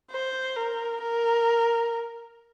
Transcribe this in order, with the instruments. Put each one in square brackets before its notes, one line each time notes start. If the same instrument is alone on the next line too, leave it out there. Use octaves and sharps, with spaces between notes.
[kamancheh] C5
A#4
A#4